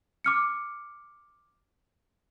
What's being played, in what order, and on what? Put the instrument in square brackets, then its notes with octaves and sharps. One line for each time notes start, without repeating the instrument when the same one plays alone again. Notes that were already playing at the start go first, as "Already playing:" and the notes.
[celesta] D6 F6 C#7